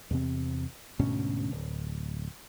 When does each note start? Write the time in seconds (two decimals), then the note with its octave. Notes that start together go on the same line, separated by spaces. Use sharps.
0.11 E2 C3 C4
0.99 D2 G#2 B2 C#4
1.52 D1